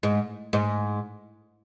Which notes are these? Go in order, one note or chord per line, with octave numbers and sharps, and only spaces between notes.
G#2
G#2